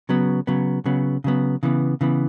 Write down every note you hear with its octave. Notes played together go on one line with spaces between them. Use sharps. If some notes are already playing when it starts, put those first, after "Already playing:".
C#3 F#3 B3
C#3 F#3 B3
C#3 F#3 B3
C#3 F#3 B3
C#3 E3 B3
C#3 E3 B3